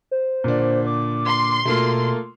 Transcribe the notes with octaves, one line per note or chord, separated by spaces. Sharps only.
C5
A#2 D3 D4
D6
C6
B2 A3 A#3 F4